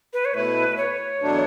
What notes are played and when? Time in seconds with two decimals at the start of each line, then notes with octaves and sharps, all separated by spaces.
0.13 B4
0.25 C#5
0.34 B2 A3 E4 B4
0.77 C#5
1.21 E2 B2 F#3 A3 D4